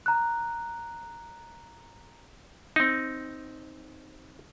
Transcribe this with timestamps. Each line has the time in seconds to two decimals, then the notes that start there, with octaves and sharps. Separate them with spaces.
0.06 A#5 F#6
2.76 C4 D#4